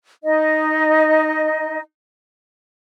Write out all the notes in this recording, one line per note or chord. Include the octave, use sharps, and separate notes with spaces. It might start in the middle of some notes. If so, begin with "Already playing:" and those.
D#4 D#5